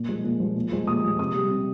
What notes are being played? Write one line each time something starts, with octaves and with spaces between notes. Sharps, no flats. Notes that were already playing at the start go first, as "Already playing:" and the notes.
Already playing: A#2
F3 G#3
A#2
F3 G#3
A#2
F3 G#3
A#2 D#6
F3 G#3
C3 D#6
G3
C3